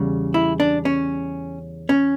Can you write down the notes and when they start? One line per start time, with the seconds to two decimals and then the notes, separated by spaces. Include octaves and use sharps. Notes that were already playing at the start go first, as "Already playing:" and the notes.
Already playing: E2 C#3 G3
0.34 E4
0.60 D4
0.85 C#4
1.89 C#4